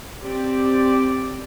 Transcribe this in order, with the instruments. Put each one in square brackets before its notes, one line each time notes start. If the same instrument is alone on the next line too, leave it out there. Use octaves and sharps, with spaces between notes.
[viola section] C4 G4 D5